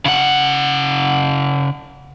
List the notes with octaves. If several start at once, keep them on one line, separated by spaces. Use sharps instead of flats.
C#3 F#5